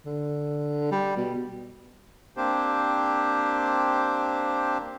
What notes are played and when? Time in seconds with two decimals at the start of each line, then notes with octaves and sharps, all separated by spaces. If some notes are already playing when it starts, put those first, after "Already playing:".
0.06 D3
0.92 G3
1.17 B2
2.37 A#3 C4 D4 G4 C5